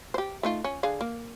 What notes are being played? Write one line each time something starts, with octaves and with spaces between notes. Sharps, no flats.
G4 C5
A3 D#4 F4
C#4
D3 G#4 F5
A#3